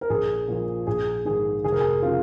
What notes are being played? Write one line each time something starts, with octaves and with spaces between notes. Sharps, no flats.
A#4
A#1 G#4
A#2 F3
A#1 G#4
G#2 D#3 G#4
F1 G#4
A#4
G#4
C#3 F3 F4